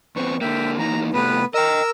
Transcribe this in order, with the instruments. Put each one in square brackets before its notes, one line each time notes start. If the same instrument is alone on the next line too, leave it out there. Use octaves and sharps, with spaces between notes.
[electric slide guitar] E2 B3 C4 [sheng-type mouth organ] C#6
[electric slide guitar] D3 A#3 [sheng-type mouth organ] E5 G5
[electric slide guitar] E3 A#3 D#4 [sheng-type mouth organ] A#5
[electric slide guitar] A2 C3 A3 [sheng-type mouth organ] B3 B4
[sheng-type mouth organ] A#4 E6 [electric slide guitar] D#5 G5